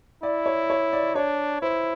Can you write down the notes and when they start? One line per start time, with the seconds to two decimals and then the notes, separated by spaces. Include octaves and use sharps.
0.23 E4 D5
0.46 C#5
0.70 C#5
0.93 D5
1.15 D4 C#5
1.62 E4 C5